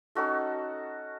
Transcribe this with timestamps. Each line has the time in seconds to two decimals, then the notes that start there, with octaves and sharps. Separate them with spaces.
0.15 C#4 D#4 F#4 A4